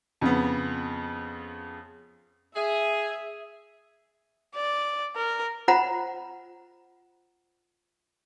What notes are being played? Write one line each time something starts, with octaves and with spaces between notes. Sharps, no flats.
F2 C#3 B3
G#4 E5
D5
A#4
F4 C5 F#5 A#5 B5